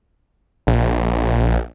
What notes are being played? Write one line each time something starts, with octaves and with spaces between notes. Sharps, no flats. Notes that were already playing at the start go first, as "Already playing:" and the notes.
A#1